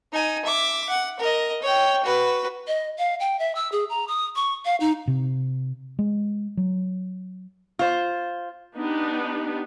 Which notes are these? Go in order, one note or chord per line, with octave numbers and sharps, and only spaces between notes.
D#4 G#5
E5 D6
F#5
A#4 D#5
C#5 G5
F#4 B4
D#5
F5
G5
E5
E6
G#4
A#5
D#6
C#6
F5
D#4
C3
G#3
F#3
F4 C5
B3 D4 D#4 G4